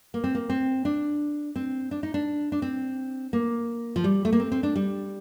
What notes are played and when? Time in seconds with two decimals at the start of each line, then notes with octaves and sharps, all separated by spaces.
0.14 A#3
0.24 C4
0.35 A#3
0.50 C4
0.85 D4
1.56 C4
1.91 D4
2.03 D#4
2.14 D4
2.52 D4
2.62 C4
3.33 A#3
3.96 F3
4.04 G3
4.25 A3
4.33 A#3
4.40 C4
4.52 C4
4.63 D4
4.76 G3